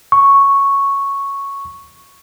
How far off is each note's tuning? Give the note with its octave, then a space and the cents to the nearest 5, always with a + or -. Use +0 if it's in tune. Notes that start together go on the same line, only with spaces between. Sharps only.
C#6 +0